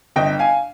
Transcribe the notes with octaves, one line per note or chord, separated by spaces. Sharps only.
G1 D#5 G5
F5 G#5